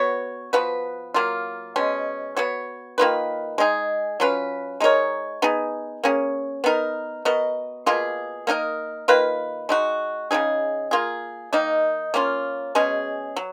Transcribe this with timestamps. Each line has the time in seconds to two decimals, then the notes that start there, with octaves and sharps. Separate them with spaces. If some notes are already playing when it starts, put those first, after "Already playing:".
Already playing: B3 F#4 C#5
0.53 F3 B3 F#4 B4
1.14 F#3 A#3 F4
1.76 B2 G#3 C#4
2.37 B3 F#4 C#5
2.98 D#3 A#3 F4 B4
3.58 G#3 D#4 G#4
4.20 F#3 C#4 F4 B4
4.80 G#3 D#4 A#4 C#5
5.42 B3 D#4 G#4
6.04 A#3 C#4 G#4
6.64 B3 D#4 A#4
7.25 B3 F#4 A#4 D#5
7.86 B2 A#3 F4 G#4
8.47 A#3 D#4 A#4 D#5
9.08 D#3 A#3 F4 B4
9.69 G#3 D#4 F#4
10.31 C#3 G#3 D#4 G#4
10.91 A#3 F4 G#4
11.53 D#3 A#3 D#4
12.14 A#3 C#4 F4
12.75 B2 G#3 C#4 G#4
13.36 F#3